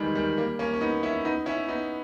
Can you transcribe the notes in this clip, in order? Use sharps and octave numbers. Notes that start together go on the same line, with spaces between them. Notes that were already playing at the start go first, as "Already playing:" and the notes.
Already playing: D#3 E3 G3 G#3
D#3 G3
G3 A#3
A#3 C#4
C#4
B3 D#4
C#4 E4
B3 D#4
C#4 E4
B3 D#4